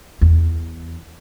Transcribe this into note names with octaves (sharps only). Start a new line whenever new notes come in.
E2